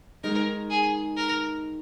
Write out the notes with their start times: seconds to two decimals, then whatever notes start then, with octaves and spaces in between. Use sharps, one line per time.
0.23 D#3 G#3 D#4 A#4
0.70 G#4
1.17 A#4